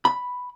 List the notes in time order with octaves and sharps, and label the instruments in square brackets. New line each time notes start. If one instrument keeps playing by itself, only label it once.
[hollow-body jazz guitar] B5